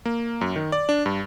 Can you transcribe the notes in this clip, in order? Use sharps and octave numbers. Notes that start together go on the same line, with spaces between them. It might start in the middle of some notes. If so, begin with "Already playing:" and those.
A#3
F#2
D#3
D5
D4
G2